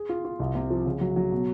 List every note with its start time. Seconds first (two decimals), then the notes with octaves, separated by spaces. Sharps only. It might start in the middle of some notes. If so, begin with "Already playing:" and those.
Already playing: G#4
0.09 F4
0.25 F4
0.40 C2
0.55 C3
0.70 F3
0.85 C#3
1.01 F#3
1.16 F#3
1.32 B2